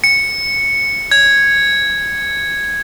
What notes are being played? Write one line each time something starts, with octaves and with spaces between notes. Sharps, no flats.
C#7
G#6